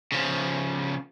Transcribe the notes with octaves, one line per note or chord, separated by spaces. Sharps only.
C#3 F3